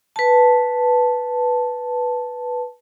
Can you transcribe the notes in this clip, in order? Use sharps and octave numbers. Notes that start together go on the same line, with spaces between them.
B4 A5